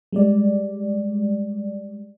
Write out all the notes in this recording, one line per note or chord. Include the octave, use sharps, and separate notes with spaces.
G3 G#3 D5